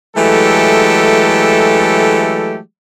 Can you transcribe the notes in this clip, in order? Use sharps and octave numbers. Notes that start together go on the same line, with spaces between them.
E3 F#3 G#3 A3 G4 A4